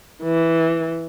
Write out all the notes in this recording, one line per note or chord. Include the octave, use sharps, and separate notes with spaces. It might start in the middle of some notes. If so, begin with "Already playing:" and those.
E3